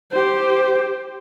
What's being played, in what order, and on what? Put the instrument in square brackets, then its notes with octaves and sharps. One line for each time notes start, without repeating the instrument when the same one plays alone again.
[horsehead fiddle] G4 C5